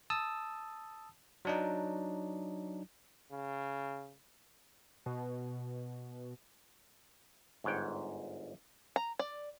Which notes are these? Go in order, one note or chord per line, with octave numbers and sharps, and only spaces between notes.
A5 D#6 E6
F#3 D4 D#4
C#3
B2
G1 G#2 C#5 F#5 G5
A#5
D5